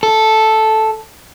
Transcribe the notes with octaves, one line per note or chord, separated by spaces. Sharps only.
A4